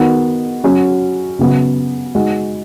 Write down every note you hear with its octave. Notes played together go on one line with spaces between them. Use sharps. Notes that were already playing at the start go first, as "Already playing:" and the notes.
Already playing: D#3 B3 F#4
F#3 C#4 F#4
C#3 F#3 B3 F#4
G#3 D#4 F#4